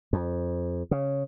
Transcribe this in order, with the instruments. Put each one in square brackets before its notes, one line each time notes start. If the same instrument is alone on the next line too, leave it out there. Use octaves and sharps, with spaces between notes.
[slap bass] F2
C#3